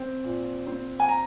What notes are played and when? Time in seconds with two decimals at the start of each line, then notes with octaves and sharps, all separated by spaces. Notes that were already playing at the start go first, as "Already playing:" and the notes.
Already playing: C4
0.24 A#2
0.67 C4
1.00 G#5
1.09 A#5